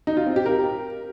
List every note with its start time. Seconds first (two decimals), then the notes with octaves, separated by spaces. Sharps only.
0.07 D#4
0.17 F4
0.26 C4
0.36 G4
0.46 A#4